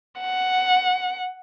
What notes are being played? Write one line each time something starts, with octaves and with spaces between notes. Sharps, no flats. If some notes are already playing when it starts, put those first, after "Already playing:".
F#5